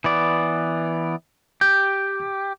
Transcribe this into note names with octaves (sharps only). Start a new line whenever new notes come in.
E3 B3 D5
G4 G6